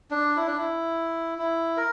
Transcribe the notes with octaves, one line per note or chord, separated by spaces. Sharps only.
D4
E4
D4
E4
E4
A#4